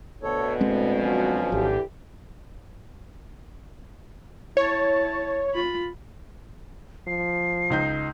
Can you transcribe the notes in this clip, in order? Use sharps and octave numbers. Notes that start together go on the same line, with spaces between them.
D2 B2 A4 C#5
A2 G#3 C4
F3 F#3 C#4
G#1 D3 E3 G4
E4 C#5 A5
F4 B5
F3 C7
C#2 D#4 G6